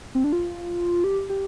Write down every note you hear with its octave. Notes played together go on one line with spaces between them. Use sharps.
C4
D4
F4
G4
G4